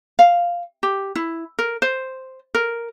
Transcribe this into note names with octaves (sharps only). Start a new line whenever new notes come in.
F5
G4
E4
A#4
C5
A#4